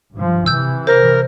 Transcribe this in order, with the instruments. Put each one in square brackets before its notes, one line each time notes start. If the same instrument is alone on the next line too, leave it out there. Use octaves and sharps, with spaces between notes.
[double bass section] G2 F3
[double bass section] C3 E3 [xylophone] E6 G6
[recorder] A#4 [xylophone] C5